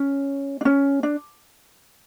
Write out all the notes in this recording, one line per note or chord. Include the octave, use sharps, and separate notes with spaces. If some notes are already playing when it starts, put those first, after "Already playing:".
Already playing: C#4
D4
C#4
D4